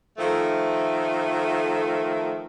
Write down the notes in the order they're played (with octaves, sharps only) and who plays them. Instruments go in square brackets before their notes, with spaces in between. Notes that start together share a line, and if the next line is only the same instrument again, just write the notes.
[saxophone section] D#3 F3 A3